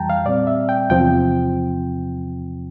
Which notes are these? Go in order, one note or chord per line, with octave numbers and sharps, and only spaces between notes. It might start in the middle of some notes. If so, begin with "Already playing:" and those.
Already playing: F2 E3 G3 G5 A5 A#5
F5
A#2 G3 C4 D5
E5
G5
E2 C3 F3 C4 G5